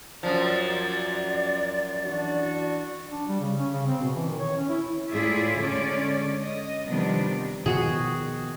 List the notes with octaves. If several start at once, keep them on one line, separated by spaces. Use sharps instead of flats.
F#2 F3 D5
E3 D4 F#4
D4
G3
C#3
C#4
C#3
C4
B2
E3
D#3
C#5
C#4
E4
A2 E4 F4 G#4 D5 E5
D3 G#3 C#4 D5
D#5
C3 D#3 F3 G3 B3 D4
B2 D#3 F3 F#4 G#4